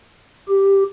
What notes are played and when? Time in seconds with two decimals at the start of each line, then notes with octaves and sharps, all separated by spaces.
0.48 G4